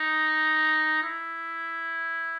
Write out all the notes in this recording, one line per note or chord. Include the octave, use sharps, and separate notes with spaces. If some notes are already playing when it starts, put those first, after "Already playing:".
Already playing: D#4
E4